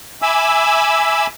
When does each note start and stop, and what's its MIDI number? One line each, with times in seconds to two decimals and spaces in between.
0.22 1.26 76
0.22 1.26 80
0.22 1.26 83
0.22 1.26 86
0.22 1.26 88